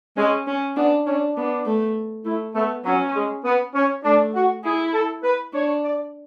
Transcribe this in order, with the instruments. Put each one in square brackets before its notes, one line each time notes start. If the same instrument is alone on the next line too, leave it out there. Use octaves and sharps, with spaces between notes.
[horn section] G#3 [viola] C#4
[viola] C#4
[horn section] B3 [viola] D4
[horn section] C#4 [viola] D4
[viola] B3 [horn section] D4
[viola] A3
[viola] A3 [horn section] E4
[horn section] A3 [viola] B3
[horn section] F#3 [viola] C#4
[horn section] G#3
B3
C#4
[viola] A3 [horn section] D4
[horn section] F#4
[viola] E4 [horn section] G#4
[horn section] A4
B4
[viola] D4 [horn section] C#5
[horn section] D5